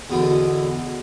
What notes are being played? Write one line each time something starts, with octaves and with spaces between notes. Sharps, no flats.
E2 B2 D3